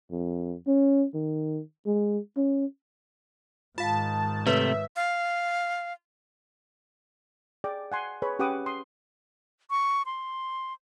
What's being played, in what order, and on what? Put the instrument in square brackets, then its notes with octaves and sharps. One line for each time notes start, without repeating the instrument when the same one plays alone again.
[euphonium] F2
C#4
D#3
G#3
C#4
[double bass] G#2 D#3 [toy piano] F4 F5 [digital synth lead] A5
[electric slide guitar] C3 A3 [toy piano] B4 C#5 [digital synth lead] E5
[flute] F5
[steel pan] G#4 D5 G5 D6
F#5 G#5 C6
G#4 B4 C#5 B5
C#4 G4 B4 F#5 D6 D#6
C6 D#6
[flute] C#6
C6